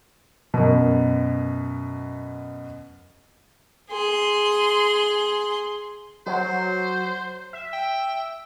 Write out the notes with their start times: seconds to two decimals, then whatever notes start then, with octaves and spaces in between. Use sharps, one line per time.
0.54 F#2 B2
3.90 G#4 C6
6.26 F#3 C5
7.53 E5
7.73 G5